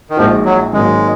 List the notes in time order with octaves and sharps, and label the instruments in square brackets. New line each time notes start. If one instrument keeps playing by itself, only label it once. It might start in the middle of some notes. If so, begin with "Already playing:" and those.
[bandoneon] D#3
[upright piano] A#1 A#2 G#3 D#4 F#4 [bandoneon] F3
[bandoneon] F#3
[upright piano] G#1 G#2 F#3 A#3 [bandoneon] G#3